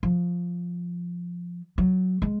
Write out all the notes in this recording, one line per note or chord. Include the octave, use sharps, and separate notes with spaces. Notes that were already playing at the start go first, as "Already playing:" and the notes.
F3
F#3
G#3